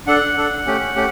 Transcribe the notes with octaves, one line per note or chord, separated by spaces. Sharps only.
D4 A4 F#5
D4 A4
A3 C#4 G4
A3 C#4 G4